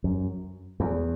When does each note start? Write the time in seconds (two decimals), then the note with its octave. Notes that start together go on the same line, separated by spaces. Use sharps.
0.04 F#2
0.80 E2